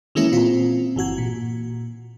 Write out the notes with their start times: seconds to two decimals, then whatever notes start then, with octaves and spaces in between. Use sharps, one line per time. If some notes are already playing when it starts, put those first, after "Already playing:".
0.15 D#3 E3 G#3 A#3 C#4 E4
0.32 A#2 C4 F4
0.96 G1 E3 F#4 G#6
1.18 A#2